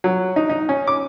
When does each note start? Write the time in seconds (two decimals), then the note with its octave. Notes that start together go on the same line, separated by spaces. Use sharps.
0.04 F#3
0.36 D#4
0.49 D#4
0.69 C#4
0.87 D6